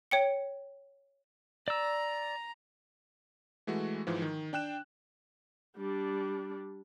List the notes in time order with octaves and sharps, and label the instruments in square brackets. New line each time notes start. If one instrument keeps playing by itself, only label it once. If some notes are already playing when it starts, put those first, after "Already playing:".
[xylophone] C#5 G5 C#7
[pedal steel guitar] D5 E6 [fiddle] A#5
[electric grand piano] E3 G#3 A3 F#4
G#2 E3 F3
D#3
D4 G5 F#6 E7
[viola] G3 D4